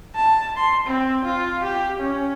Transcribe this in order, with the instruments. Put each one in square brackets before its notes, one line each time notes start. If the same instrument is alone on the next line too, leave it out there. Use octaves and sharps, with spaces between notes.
[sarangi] A5
C6
C4
F4
G4
C#4